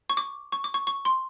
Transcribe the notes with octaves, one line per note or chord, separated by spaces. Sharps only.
C#6
D6
C#6
D6
C#6
C#6
C6